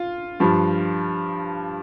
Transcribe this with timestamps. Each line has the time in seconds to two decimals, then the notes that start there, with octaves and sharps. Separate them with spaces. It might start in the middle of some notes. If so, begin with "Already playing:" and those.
Already playing: F4
0.40 G2 F3